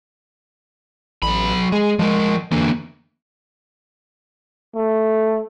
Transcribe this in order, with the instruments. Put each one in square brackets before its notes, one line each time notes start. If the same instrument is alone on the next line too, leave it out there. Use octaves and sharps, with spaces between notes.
[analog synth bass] A1 [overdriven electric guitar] F#3 B5
[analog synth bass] G#3 [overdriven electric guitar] G#4
[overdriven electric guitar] F3 A#4 [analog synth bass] G#3
[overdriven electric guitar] D3 A#3 [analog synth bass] E3
[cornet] A3